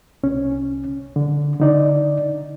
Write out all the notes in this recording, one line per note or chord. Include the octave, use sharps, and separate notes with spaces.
C2 C#4
D3
D3 D#4 D5